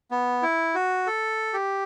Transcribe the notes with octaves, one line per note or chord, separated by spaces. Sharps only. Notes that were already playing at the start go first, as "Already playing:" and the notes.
B3
E4
F#4
A4
G4